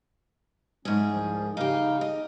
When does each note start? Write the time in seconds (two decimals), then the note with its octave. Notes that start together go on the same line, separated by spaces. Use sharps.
0.85 G#2 F#3 A3 C#4 G#4
1.09 C2 F3
1.57 C#3 D#4 G4 F5
2.01 D#5